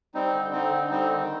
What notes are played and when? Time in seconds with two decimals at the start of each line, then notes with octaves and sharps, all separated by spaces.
0.14 G3 C4 D#4
0.34 D3
0.52 C4 D#4
0.71 D3
0.90 G3 C4 D#4
1.10 D#3